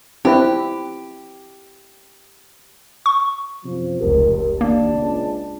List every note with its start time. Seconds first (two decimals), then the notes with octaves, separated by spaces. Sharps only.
0.25 C4 E4 G4 B4
3.06 C#6
3.65 F#2 C3 F3
3.99 F1 C#2 G4 A#4
4.61 D#2 A#3 D4
4.93 C#2